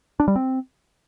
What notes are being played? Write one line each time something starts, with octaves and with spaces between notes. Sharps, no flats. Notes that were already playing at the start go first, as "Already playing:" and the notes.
D4
G3
C4